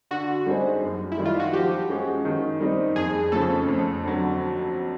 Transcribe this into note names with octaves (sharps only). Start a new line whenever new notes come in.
D3 F#4
G3 C4 D#4 G#4
F#2
E4
D#3 G3
F4
F#4
F3 G4
G#3 C#4 F#4
D#3
G3 C4 D#4
F2 G#4
C#3 F3 A3 C#4 A4
F2
D3 F#3